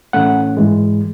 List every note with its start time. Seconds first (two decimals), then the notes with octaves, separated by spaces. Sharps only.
0.13 A2 E3 A3 C#4 F#5
0.57 G#2 E3 G#3